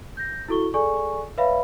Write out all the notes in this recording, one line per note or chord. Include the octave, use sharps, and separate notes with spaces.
G6 A#6
E4 F#4 A4 C#6 G7
G#4 A4 D5 G#5 C#6
B4 C#5 E5 F5 B5